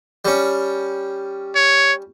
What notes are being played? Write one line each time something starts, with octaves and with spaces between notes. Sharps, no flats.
G3 C#4
C#5